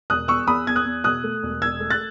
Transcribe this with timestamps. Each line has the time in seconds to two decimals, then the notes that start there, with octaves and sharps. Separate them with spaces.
0.10 E1 D#6 F#6
0.28 E2 C#6 E6
0.47 E2 B5 D#6
0.67 E2 G#6
0.76 D#6 F#6
0.85 E2
1.04 B2 D#6 F#6
1.24 A3
1.43 E1
1.62 E1 E6 G#6
1.80 A3
1.90 F#6 A6